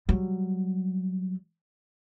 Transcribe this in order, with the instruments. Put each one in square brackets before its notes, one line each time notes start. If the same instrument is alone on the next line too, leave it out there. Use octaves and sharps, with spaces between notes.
[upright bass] F#3 G3